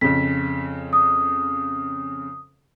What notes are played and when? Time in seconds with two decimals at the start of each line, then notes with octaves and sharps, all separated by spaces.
0.01 F2 C#3 B6
0.93 D#6